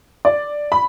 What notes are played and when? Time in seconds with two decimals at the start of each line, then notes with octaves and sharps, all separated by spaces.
0.25 D5
0.72 B5